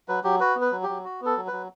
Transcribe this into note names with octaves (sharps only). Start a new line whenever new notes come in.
F#3 B4
F#3 G4
F#4 B4
B3
B4
F#3
G4
F#3
F#4
B3 A4
F#3
F#3 B4